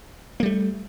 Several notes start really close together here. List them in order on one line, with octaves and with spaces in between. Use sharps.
A#3 G3 A3